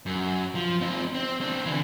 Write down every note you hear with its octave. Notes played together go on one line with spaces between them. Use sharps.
F#2
F3
C4 D#4
C4
C4 D4
D3 E3